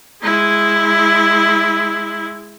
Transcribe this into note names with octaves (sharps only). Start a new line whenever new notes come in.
G#3 E4